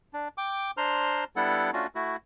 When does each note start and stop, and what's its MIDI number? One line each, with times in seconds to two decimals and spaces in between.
0.13 0.28 62
0.38 0.71 79
0.38 0.71 86
0.77 1.24 62
0.77 1.24 72
0.77 1.24 82
0.77 1.24 84
0.77 1.24 89
1.36 1.71 55
1.36 1.71 59
1.36 1.71 62
1.36 1.71 64
1.36 1.71 69
1.36 1.71 78
1.73 1.87 57
1.73 1.87 61
1.73 1.87 62
1.73 1.87 65
1.73 1.87 66
1.95 2.16 57
1.95 2.16 64
1.95 2.16 66